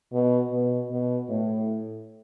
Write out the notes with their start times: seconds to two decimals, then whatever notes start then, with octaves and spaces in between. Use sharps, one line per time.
0.13 B2
0.51 B2
0.91 B2
1.29 A2